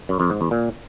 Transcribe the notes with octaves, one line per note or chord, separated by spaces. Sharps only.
F#2
F2
G#2
E2
A#2